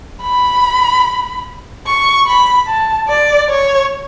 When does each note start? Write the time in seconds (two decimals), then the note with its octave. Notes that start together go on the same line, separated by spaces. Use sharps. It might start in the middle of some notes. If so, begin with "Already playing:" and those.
0.23 B5
1.87 C#6
2.27 B5
2.68 A5
3.08 D5
3.50 C#5